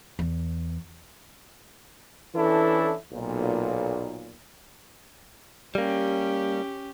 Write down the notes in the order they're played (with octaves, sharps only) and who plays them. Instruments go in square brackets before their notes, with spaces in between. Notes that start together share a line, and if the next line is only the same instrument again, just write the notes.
[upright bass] E2
[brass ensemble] E3 C#4 D4 E4 A4
B1 A#2
[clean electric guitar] G3 A#3 [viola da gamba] C#4 G4